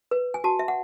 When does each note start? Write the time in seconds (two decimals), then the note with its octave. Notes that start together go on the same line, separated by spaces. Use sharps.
0.11 B4
0.34 G#5
0.44 F#4 A5
0.59 E5
0.68 F#5